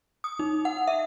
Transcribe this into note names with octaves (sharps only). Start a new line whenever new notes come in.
D#6
D#4
F#5
E5